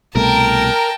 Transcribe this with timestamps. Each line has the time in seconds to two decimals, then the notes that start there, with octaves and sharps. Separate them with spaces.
0.15 C2 B2 A3 A#4 G5 A5